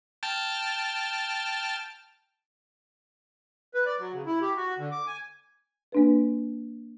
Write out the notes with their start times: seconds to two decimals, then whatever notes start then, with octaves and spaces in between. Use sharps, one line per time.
0.23 G5 A5 F6
3.74 B4
3.86 D5
3.99 F#3
4.14 C#3
4.26 E4
4.41 G4
4.57 F#4
4.78 D3
4.92 D6
5.07 G#5
5.92 A#3 D4 B4